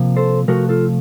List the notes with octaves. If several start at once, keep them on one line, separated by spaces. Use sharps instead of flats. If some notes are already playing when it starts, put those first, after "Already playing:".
Already playing: C3 F3 A#3
A4 C5
C3 F3 A3 F#4 A#4
F4 A4